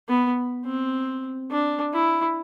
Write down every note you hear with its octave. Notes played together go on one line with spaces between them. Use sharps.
B3
C4
D4
E4